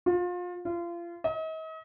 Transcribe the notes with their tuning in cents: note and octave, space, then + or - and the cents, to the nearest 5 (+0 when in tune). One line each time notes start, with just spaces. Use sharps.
F4 +30
F4 -30
D#5 +40